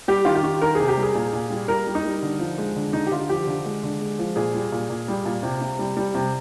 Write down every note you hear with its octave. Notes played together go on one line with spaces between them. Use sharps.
G3 G4
D#3 F4
G4
D#3
D#3 A#4
C3 G#4
G4
G3
G#4
A#2
A#2
G3
G3 A#4
G3
D#4
G3
D3
F3
G#3
D3
D3 D#4
G4
D3 F4
F3 G4
D3
G#3
D3
G#3
F3
A#2 G#4
G3
A#2
A#2
G3
A#2
C3
C3
G3
G3
C3